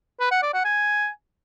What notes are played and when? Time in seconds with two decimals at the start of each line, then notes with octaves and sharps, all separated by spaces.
0.20 B4
0.31 F#5
0.43 D5
0.54 F#5
0.65 G#5